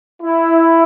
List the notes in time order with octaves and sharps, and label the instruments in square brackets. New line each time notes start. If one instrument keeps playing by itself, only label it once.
[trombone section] E4